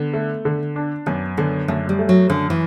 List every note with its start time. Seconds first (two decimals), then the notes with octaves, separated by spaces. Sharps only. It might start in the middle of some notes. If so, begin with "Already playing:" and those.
Already playing: D3 B3
0.13 A3
0.45 D3
0.76 D4
1.06 F#2 B3
1.37 D3 B3
1.68 F#2 A3
1.89 G3
1.99 A3
2.09 F#3
2.30 F#2 D3
2.50 E3